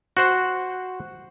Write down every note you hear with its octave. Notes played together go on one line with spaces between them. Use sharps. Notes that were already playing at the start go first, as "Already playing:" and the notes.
F#4 C5 F#5